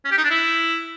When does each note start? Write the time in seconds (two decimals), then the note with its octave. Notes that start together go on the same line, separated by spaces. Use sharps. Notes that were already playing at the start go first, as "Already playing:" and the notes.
0.05 C#4
0.12 G4
0.18 D#4
0.24 D4
0.31 E4